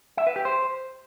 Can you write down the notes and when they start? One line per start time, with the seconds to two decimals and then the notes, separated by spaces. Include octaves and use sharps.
0.17 E5
0.27 B4
0.36 G4
0.45 C5